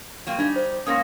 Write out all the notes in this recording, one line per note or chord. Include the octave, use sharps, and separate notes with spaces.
F#3 A#3 C4
G3 D4 D#4 G#6
C5
G#2 A#3 C#4 D#6 A#6